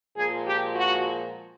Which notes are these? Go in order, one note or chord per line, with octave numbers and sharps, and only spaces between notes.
A#2 F3 G#3 G#4
G4
F#4